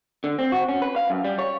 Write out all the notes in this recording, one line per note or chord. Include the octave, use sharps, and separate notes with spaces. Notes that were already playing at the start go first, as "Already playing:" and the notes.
D3
C4
F#4
C#4
B4
F5
F#2
G3
C#5